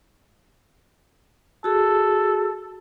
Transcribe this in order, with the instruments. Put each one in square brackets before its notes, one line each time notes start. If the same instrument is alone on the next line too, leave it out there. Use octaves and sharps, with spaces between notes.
[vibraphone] F#4 G#4 [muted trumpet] A4